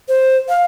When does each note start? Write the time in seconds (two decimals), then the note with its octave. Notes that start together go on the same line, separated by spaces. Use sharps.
0.09 C5
0.49 F5